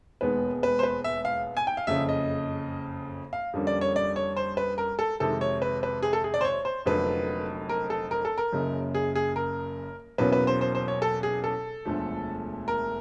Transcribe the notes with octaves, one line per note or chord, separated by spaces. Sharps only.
E1 D#2 D#3 G#3 B3 B4
B4
C5
B4
E5
F5
G#5
G5
F5
F#1 F2 C#3 E5
D#5
F5
F2 D3 G3 A#3 C#4
D5
C#5
D5
C#5
C5
B4
A#4
A4
F2 C3 D#3 G#3 A4
C#5
B4
B4
G#4
A4
G#4
D5
C5
C#5
C5
F1 F2 D3 F#3 A#3 B4
A#4
A4
A#4
A4
A#4
F#1 F#2 C#3
G#4
G#4
A#4
E2 B2 F#3 A#3 C#4 B4
B4
C5
C5
C5
C#5
A4
G#4
A4
E1 D2 D3 F3 A3
A#4